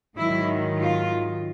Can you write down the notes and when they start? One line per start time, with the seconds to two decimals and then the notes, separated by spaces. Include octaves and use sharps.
0.17 G#2 D#3 F#3 E4
0.79 F4